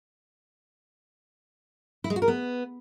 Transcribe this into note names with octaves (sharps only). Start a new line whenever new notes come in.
E4
G#3
F#4
A#4
B3